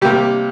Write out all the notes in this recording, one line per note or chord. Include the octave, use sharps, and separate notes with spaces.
C3 G3 A#3 G4